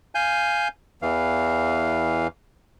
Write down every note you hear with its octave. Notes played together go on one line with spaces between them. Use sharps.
F5 G#5 G6
E2 E3 F5